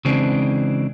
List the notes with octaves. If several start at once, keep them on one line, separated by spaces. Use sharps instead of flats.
C#3 E3 G#3 C4 D4